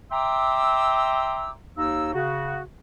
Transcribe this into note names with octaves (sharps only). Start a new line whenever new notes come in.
E5 G5 A#5 C6 D6 E6
D#2 D#4 E6
C#3 F#4